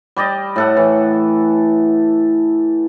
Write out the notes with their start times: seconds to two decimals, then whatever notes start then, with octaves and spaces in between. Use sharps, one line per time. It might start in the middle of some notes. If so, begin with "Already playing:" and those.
0.16 G3 G4 D5 D#5
0.56 A2 A4 F#5
0.77 E3